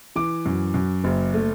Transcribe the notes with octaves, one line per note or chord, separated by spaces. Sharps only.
E3 D6
F#2
F#2
F#1
A3